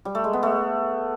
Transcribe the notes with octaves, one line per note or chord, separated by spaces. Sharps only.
G3
A3
G#3
B3
A3